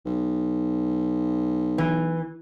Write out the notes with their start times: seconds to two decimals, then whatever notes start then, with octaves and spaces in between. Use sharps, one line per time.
0.06 B1
1.78 E3